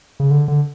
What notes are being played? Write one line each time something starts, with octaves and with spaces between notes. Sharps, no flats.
C#3
D3
D3